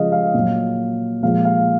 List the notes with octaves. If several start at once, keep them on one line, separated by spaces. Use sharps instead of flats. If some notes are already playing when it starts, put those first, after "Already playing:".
Already playing: C#3 F3 G#3 D#5 F5
F5
A#2 F#3
A#2 F3 G#3 F5
F5